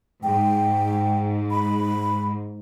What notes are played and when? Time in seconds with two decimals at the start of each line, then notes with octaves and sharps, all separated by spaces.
0.23 G#2 G5
1.51 B5